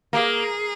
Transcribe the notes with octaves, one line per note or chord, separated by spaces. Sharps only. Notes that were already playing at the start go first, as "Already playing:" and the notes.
A#3 G#4